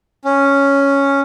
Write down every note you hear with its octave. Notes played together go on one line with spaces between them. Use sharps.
C#4